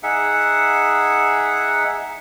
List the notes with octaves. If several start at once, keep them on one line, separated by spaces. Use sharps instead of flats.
D#4 G#4 E5 F#5